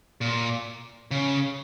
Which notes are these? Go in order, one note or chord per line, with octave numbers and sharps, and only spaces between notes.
A#2
C#3